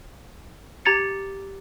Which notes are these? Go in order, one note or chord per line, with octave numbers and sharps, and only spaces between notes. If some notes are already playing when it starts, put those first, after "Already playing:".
G4 A#5 G#6 A6 C#7